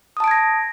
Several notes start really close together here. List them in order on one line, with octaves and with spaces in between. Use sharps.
D#6 A5 D7 G#6 A#6